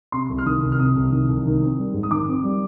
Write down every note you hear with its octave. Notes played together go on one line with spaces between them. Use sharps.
C3 C6
C2
F6
D#3 D#6
C2
F6
C3 D#6
C2
D#3
C2
D#3
C4
G3
G#2
D#6
D#3 D6
C4
G3